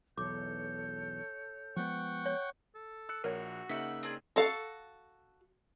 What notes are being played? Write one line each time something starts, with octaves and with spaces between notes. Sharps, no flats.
B1 E2 A4 C#5 D6 G6
F3 G#3 B3 F#5 G5 C#6
C#5
A4
E6 F#6 C#7
A#1 F#4 A#4 C#5
C#3 A#3 D#4 E5 F#5 B6
C4 D4 G#4
F#4 A4 F5